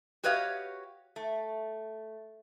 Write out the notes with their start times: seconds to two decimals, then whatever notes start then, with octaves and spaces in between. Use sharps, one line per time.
0.24 F#4 G4 B4 C#5 D#5 F5
1.16 A3